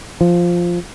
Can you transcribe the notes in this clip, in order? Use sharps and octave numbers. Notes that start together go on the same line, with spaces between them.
F3